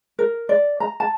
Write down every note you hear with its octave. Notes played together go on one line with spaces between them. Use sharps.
A#4
D5
A#5
A5